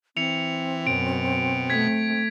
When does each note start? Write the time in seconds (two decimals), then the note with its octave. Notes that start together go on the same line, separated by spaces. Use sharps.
0.17 E3 C4 C#7 F7
0.87 F#2 B2 D7
1.70 A3 G#6 B6